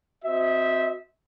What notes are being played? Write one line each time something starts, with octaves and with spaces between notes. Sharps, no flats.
C4 F#4 C5 D#5 E5